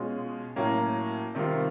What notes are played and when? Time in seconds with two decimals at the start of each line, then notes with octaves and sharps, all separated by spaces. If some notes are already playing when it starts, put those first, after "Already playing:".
Already playing: B2 G#3 C#4 F4 G#4
0.56 A2 F#3 A#3 C#4
1.35 C3 D#3 G3 C4 F4